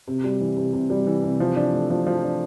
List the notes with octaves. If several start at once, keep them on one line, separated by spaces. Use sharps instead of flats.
C3
G3
E3
C3
C3
G3
E3
C3
F3
D4
A3
F3
F3
D4